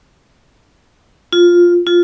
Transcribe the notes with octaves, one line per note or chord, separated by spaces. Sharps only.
F4
F4